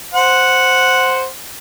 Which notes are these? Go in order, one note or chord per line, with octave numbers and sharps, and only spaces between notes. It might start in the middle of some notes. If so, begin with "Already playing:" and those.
C5 F#5